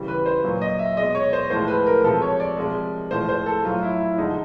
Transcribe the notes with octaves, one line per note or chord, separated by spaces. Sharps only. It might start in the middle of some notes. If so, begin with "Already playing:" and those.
Already playing: C#3 E3 G3
B4
C5
A#2 F#3
D#5
E5
B2 G#3 D#5
C#5
C5
A2 F3 G#3 C5
B4
A#4
C3 F3 G#3 A4
C#5
D5
C3 F3 G#3
A2 F3 G#3 C5
C5
A4
A2 F#3 F4
E4
E4
D3 F3 G#3 D#4